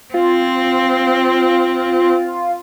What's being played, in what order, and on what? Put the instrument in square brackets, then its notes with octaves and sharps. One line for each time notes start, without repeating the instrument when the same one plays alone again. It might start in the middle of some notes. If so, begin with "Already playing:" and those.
[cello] C4 [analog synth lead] F4